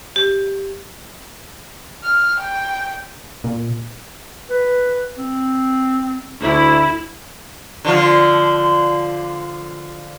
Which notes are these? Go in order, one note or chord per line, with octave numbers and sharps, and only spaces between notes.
G4
F6
G5
A#2
B4
C4
D2 E4
D3 F3 F4